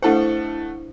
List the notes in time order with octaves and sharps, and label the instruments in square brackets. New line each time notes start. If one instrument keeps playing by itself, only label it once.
[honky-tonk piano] A3 A4 F#5 [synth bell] D4 E4 C5